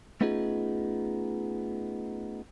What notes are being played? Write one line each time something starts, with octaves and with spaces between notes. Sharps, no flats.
A3 B3 C#4 D#4 F4 G#4